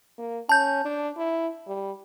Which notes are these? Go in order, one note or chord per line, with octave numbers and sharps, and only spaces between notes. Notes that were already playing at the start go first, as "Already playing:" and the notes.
A#3
C#4 A5 G6
D4
E4
G3